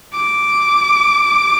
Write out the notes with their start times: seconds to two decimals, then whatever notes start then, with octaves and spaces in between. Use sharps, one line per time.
0.13 D6